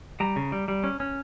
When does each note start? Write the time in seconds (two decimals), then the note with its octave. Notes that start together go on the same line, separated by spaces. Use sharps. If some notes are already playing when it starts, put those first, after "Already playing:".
0.20 G3 A#5
0.36 C#3
0.52 G3
0.68 G3
0.84 C#4
1.00 C#4